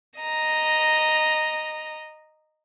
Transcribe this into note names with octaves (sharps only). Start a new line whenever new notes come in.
D#5 A#5